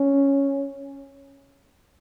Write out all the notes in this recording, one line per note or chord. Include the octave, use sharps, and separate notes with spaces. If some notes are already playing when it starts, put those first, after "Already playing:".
Already playing: C#4